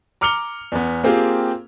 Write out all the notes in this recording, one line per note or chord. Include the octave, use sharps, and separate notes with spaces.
A#5 D6 F6 C#7 F7 G7
E2 B3
A#3 C4 F4 G4 G#4